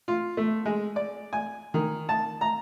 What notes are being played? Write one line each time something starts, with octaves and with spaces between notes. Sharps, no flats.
F4
A3
G#3
D5
G#5
D#3
A5
A#5